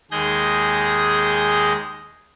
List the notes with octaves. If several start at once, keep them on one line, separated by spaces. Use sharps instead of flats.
D#2 G#3 G#4 G6 A#6